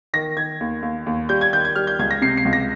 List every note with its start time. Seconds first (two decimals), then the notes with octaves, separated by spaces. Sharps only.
0.13 D#3 A#6
0.37 D#3 G#6
0.60 D#2
0.82 D#2
1.06 D#2
1.29 G3 G6
1.41 G#6
1.53 D#3 G6
1.65 G#6
1.75 G3 F6
1.87 G6
1.99 C#2 G#6
2.11 A#6
2.22 C3 C7
2.37 C7
2.45 C#2
2.53 A#6